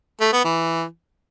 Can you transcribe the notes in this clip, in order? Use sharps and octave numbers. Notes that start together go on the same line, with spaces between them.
A3
B3
E3